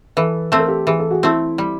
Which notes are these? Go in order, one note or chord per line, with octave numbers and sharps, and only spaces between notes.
E3 A4 B4
A3 C4 A4
A#4
G4 A4
E3 G#4
A4
F#4 G#4
A3 C4 E4
G3